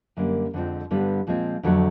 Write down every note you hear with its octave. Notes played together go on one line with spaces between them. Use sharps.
F#2 D3 G3 A#3
F2 D3 F3 G#3 C4
G2 D3 G3 B3
A#2 F3 G#3 C4
F2 D3 F#3 A3